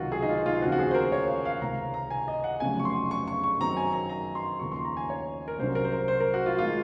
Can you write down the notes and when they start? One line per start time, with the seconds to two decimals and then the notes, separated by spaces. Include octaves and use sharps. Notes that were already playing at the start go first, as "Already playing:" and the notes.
Already playing: C#2 C3 D#3 F#3 C4 F4 F#4
0.12 G#4
0.22 D#4
0.29 F4
0.46 F4
0.61 D#2 C#3 F3 C4 F#4
0.72 F#4
0.79 G#4
0.91 C5
0.94 A#4
1.12 C#5
1.28 F5
1.45 F5
1.61 C#2 C3 D#3 A#5
1.94 A#5
2.10 G#5
2.28 D#5
2.44 F#5
2.60 F1 F2 C#3 F#3 G#5
2.79 C#6
2.85 C6
3.11 C#6
3.28 C#6
3.44 C#6
3.60 F#2 D#3 F#3 C4 A#5
3.77 G#5
3.93 A#5
4.09 A#5
4.35 C6
4.59 D#2 C#3 F3 C#6
4.72 C6
4.85 A#5
4.97 G#5
5.10 C#5
5.48 A#4
5.58 C2 C3 F#3 C#4 C5
5.75 A#4
5.85 C5
5.92 A#4
6.08 C5
6.20 A#4
6.34 F#4
6.46 F4
6.59 D#3 G#3 F4